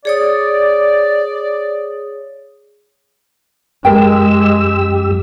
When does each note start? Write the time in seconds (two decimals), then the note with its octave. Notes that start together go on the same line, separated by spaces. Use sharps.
0.05 G#4 C#5 D5 D#6
3.85 F#2 G#3 G4 A#4 G5 E6